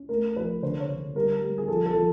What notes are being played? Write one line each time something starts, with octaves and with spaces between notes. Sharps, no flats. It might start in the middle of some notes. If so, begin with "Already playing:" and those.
Already playing: C#4
A3 A#4
F3 B4
D3 C5
C#5
D3
G3 A#4
G3
G#4
F3 A4
A4
F3